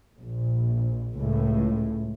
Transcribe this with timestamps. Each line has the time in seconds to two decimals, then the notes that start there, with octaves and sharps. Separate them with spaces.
0.19 A#1
1.18 C#2 A2